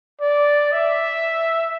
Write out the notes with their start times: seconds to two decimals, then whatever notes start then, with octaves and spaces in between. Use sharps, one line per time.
0.20 D5
0.72 E5